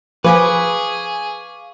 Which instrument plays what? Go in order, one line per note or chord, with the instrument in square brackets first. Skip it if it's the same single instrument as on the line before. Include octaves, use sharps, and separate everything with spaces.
[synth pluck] F3 G#5 B5 [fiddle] G#4 [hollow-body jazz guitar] B4 [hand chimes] F5 C#6 D6